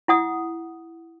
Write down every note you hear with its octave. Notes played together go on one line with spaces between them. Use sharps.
E4 F#5 D#6